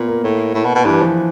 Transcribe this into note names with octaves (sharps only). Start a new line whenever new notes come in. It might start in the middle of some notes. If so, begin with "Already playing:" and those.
Already playing: A#2 B3
A#3
A2
A2
B2
B2
G2 E3
F3